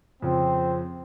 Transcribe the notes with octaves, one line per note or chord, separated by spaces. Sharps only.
F2 C#3 F3 C4